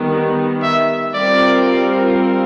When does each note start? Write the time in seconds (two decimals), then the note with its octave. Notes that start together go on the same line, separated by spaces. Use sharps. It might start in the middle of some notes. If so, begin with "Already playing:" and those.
Already playing: D#3 G3 B3
0.63 E5
1.14 G3 C4 F4 A#4 D5